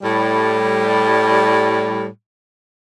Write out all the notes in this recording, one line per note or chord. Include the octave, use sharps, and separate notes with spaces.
A2 G3